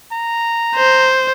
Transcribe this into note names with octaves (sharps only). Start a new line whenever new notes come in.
A#5
C5